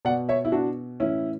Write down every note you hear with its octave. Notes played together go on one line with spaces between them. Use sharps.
B2 D5 F#5
C#5 E5
E4
B2 D4 F#4
A2 E3 C#4 E4